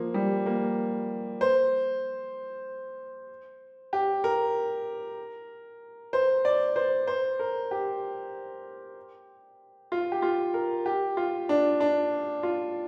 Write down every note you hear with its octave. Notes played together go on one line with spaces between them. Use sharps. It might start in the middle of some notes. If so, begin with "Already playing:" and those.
Already playing: F3 A#3
G3
A#3
C5
G4
A#4
C5
D5
C5
C5
A#4
G4
F4
G4
F4
A#4
G4
F4
D4
D4
F4